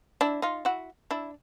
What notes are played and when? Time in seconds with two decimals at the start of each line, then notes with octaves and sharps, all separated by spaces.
0.21 D4 E4
0.42 D#4 F4
0.65 E4 F#4
1.11 D4 E4